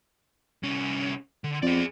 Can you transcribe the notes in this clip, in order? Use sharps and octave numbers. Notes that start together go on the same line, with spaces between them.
C2 C#4
D3
F2 G#4 D5